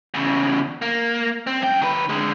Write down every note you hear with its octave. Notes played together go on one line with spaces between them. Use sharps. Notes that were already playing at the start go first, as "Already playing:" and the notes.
E2 C#3
A#3
C4
F#2 G5
D#3 B4
D3 G#3